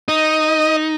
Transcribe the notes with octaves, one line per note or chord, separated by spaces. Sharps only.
D#4 D#5